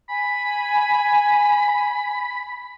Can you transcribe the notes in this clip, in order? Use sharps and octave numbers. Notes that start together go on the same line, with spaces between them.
G#5 B5